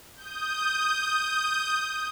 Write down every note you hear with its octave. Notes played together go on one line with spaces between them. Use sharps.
D#6 G6